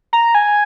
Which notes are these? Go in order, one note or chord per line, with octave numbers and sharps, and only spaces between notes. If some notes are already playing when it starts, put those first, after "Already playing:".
A#5
G#5